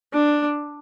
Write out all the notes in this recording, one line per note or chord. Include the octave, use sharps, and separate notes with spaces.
D4